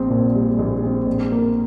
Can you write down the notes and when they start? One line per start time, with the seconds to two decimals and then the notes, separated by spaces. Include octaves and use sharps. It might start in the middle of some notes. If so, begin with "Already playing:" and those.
Already playing: A#1 C4
0.10 A#2
0.34 G3
0.59 A#1
0.83 C4
1.07 A#1
1.32 A#3